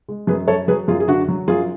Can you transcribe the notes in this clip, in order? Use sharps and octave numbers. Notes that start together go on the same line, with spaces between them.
G#3
F#2 G#4 B4
F#3 A4 C#5
F#3 G#4 B4
F#2 F4 G#4
G#4
D3 D4 F#4
F#3
F#2 F4 G#4